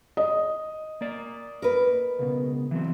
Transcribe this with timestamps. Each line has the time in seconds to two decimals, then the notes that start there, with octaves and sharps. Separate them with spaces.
0.17 D#5
1.01 A#3 D5
1.62 A#4 B4
2.19 C#2 B2
2.71 E3 F#3 C4